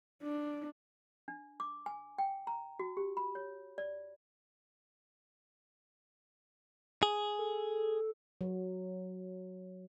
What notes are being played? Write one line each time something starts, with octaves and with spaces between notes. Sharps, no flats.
D4
D4
D6
G#5
G5
A#5
F#4
G4
B5
C#5
D5
G#4
A4
F#3